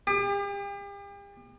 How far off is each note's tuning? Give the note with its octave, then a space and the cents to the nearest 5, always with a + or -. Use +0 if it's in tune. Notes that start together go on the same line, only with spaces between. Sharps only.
G4 +40